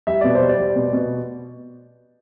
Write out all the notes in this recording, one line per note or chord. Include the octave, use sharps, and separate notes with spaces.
G3 E5
B2 D5
C5
G3
D5
G3
B2
B2